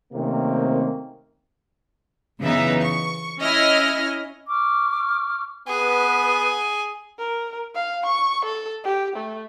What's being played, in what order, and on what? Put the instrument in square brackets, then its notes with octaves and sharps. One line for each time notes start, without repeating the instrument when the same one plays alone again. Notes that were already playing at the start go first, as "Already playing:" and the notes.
[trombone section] C3 D#3 A3 A#3 C4 C#4
[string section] F#2 C#3 E3 B3 D#4 E5
C#6
C#4 E4 D#5 F6
[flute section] C#6 D6 F6
[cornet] B3 [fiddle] G#4 [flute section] B4
[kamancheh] A#4
F5
C#6
A4
G4
A3